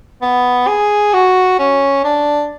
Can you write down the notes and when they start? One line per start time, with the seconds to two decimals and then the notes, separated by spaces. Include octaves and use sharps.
0.22 B3
0.67 G#4
1.13 F#4
1.59 C#4
2.04 D4